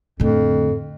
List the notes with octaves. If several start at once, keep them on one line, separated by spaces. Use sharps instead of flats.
F2 A2 D3